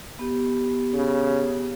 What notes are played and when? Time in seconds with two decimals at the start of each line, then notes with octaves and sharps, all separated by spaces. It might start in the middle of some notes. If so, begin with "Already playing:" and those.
0.19 B3 G4
0.93 C#3